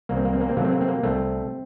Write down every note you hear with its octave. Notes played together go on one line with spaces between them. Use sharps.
C2 A#3
C4
A#3
C4
A#3
C4
C3 F#3 A3 A#3
C4
A#3
C4
A#3
C2 A3 C4